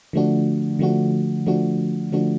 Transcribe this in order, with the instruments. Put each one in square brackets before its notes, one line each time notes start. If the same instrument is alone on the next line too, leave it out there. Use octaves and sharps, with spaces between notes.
[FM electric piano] D3 F3 A3 D4 F#4
D3 F3 A3 D4 F#4
D3 F3 A3 D4 F#4
D3 F3 A3 D4 F#4